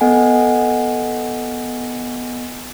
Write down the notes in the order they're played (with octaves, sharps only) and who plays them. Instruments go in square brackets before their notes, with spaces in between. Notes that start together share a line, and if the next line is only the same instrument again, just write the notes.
[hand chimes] B3 A4 D#5 F#5 G#5